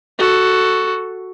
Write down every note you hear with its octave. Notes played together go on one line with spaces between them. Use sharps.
F#4 A4